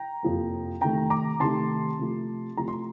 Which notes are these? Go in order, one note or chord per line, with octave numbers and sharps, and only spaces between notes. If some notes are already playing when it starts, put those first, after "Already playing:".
Already playing: G5 A#5
F2 C3 F3 A#3
C3 D#3 A3 G5 A#5
A#5 D6
C3 D#3 A3 A5 C6
C3 F3 A3
C3 F3 A3 A#5
C6